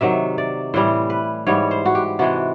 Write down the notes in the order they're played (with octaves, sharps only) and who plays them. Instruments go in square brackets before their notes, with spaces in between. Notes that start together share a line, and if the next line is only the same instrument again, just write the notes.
[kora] C3 D#3 F#3 E5
D5
A2 E3 G3 C5
B4
G#2 E3 G3 C#5
C5
F#4
G4
C3 E3 G#3 F#4